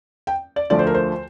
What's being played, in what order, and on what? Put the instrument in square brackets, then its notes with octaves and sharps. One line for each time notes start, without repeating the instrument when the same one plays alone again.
[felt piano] G5
D5
D2 D3 F3 A3 D5
C5
A#4
C5